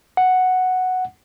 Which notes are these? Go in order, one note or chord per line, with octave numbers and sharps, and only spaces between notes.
F#5